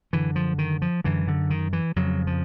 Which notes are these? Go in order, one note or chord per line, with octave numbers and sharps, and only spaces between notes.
F#2 D3 E3
F3
D#3
F3
F#2 D3 E3
D3
D#3
E3
F2 C#3 F#3
F3